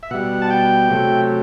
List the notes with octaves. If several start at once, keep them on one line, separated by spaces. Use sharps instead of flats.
E5
B2 G3 F#5
A5
G5
C3 F#3 A3